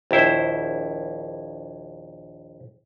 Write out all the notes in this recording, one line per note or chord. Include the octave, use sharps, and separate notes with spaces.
A#1 D#2 E4 C5